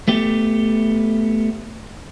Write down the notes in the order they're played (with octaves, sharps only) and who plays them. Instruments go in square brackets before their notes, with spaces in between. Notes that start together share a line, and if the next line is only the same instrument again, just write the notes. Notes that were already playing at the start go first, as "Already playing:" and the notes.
[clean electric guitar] A3 B3 G4